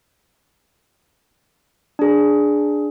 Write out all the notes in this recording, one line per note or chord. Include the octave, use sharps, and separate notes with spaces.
D4 G#4